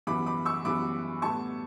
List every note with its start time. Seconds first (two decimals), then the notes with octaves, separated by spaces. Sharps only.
0.07 F#2 E3 G3 B3 B5 D6
0.26 B5 D6
0.45 C#6 E6
0.65 F#2 E3 G3 B3 B5 D6
1.22 A2 G3 B3 A5 C#6